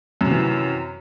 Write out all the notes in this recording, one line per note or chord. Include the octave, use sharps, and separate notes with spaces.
F#2 C3 E3